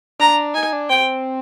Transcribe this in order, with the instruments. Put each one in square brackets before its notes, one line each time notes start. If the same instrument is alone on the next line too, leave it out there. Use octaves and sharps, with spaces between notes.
[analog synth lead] D4 [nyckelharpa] A#5
[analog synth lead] D#4 [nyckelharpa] G#5
[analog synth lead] D4
[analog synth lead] C4 [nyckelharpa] G5